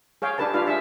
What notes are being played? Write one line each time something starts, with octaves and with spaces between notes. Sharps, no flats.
G#4 C#5 F5 G5
D4 G4 A4 B4 A5
D4 F4 G4 B4 F5
G#4 E5 A5